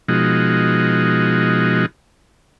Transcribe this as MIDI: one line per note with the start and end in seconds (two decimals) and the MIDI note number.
0.08 1.86 47
0.08 1.86 53
0.08 1.86 56
0.08 1.86 63
0.08 1.86 66